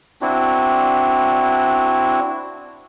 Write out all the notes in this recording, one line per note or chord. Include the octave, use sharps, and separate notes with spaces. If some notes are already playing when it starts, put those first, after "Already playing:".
C4 D4 E4 F#4